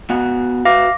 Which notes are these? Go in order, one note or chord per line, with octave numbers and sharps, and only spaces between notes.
B3 F#4 G#5
F#4 B4 E5 F5 D6 A#6